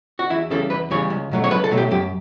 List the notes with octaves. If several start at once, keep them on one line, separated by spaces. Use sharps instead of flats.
F#4
E2 E4
C#3 E3 G3 A4
E2 B4
C#3 E3 G3 C#5
C#2
B2 F#3 A3
C#5
C#2 B4
A4
B2 F#3 A3
G4
F#2 G4